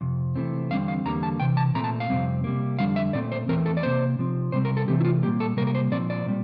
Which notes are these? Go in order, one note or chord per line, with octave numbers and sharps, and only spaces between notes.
F2 C3
C3 E3 A3 C4
E2 D3 G3 C4 F5
F5
E2 D3 G3 A#3 A#5
A5
C3 E3 G5
A5
A#2 A3 C4 A#5
A5
F5
F2 C3 G3 C4
C3 G3 A#3
F2 D3 G3 F5
E5
A#2 A3 C4 D5
C5
E2 E3 A3 C4 A#4
A4
D5
C3 E3 A#3 C5
C3 F3 C4
C3 G3 C4 C5
A#4
A4
C3 E3 A3 C4 G4
E4
F4
A#2 G3 A#3 G4
A4
C3 G3 A#3 A#4
A#4
C5
A#2 F3 C4 D5
D5
A#2 G3